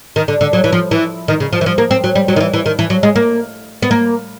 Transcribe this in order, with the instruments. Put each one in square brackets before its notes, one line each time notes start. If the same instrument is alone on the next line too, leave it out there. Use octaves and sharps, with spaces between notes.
[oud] D#3
D3
D3
F#3
E3
F3
E3
D#3
C#3
F3
E3
F3
A#3
C4
F#3
G3
F#3
D#3
E3
E3
D#3
E3
F#3
G#3
A#3
B3
A#3